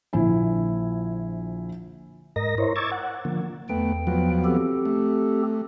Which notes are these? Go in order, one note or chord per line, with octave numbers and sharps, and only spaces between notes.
A#1 D3 F3 E4 G#5
G#2 A#4 D#5 A#6
E4 A#4 C5 C#5
C#6 D6 E6 G#6 A6
F#5
D3 F3 A#3
E2 A3 B3 G5
F3 F#3 B3
C4 G4 A4
A3